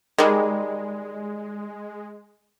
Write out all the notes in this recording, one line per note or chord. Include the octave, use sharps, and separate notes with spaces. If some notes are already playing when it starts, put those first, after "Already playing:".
D#3 G3 G#3